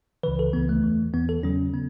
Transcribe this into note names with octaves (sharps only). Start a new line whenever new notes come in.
C#2 C#3 E3 B4
A4
C#2 C#3 E3 B3
A3
E2 E3
E2 E3 B3
A4
E2 C#3 F#3 C#4
C#3 B3